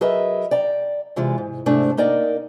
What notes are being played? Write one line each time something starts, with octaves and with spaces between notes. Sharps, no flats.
F#3 G#4 A#4 B4 D#5 E5
D5 G5 A#5
C3 E3 G#3 F4
G#2
G#2 C3 A3 D4
A#3 D#4 A#4 D5 D#5 G5